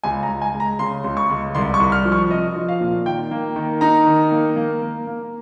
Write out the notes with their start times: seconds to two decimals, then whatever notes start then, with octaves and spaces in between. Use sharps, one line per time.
0.04 C#2 G#5
0.23 A#5
0.29 C#2
0.42 G#5
0.54 G#3
0.60 A#5
0.79 C#3 C6
1.04 C#2
1.17 C#6
1.30 C#2
1.55 C2 C6
1.74 C#6
1.80 C2
1.92 F6
2.05 F3
2.12 C#6
2.30 C4 D#5
2.56 F3
2.69 F5
2.81 A#2
3.06 D#3 G5
3.31 A#3
3.56 D#3
3.81 D#4 A#5
4.07 D#3
4.32 A#3
4.56 A#3
4.82 A#3
5.07 A#3